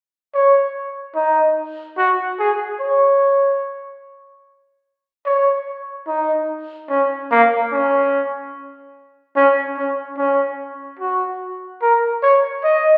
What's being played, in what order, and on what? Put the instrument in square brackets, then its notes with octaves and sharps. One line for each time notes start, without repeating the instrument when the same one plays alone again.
[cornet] C#5
D#4
F#4
G#4
C#5
C#5
D#4
C#4
A#3
C#4
C#4
C#4
C#4
F#4
A#4
C#5
D#5